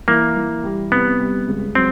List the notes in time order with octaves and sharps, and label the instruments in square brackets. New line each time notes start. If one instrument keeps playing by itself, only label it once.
[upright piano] E3 [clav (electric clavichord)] A#3
[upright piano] E3
G3
[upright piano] C3 [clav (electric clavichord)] B3
[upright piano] G3
C#2
[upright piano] F#3 [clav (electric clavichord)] C4